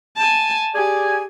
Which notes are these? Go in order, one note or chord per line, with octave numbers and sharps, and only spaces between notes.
G#5 A5
G4 G#4 D5 G#5